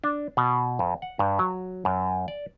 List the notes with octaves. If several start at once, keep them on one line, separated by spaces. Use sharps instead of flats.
D4
B2
F2
F#5
G2
F#3
F#2
D5